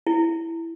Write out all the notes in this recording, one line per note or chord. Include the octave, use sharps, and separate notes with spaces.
E4